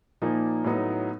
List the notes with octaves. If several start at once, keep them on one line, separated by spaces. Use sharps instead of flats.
A#2 F3 A#3 D#4
A2 F#3 B3 D#4